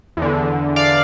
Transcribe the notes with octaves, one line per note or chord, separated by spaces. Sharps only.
E2 D3
D5 F5